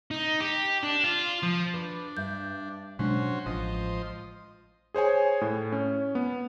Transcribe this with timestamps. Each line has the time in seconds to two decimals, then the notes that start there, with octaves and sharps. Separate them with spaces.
0.11 D#4
0.40 G4
0.83 D4
1.04 F4
1.43 F3
1.74 D4 B4
2.17 G2 E5 G6
2.99 B2 F#3 G#3 C#4 D4 F#4 C5
3.46 A1 F3 C5 D#5
4.94 G#4 C5 C#5 G#5
5.41 A2
5.72 C#4
6.15 B3